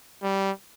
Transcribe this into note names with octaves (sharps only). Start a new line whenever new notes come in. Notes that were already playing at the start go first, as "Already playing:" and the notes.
G3